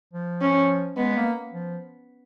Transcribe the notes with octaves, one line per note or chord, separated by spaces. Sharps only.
F3
C#4
G#3 B3
A#3
F3